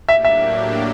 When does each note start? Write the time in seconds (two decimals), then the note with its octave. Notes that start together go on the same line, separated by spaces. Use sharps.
0.08 A2 F#3 A#3 D4 G4 E5
0.25 E5